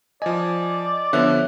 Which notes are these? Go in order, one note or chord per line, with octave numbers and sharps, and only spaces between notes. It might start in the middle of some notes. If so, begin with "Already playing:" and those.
F3 D5 D#5 G#5
D3 F3 B3 C#5 E5 F#6